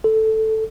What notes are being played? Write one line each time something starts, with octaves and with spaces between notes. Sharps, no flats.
A4